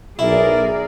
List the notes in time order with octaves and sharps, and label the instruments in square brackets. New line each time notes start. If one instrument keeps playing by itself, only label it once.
[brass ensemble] B1 [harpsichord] E4 [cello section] G#4 A#4 D5